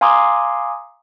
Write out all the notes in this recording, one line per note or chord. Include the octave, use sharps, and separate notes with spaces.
F5 G#5 A#5 C6 D6 D#6